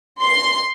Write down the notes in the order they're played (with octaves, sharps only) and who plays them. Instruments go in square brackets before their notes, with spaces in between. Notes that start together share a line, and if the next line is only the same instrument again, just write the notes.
[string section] C6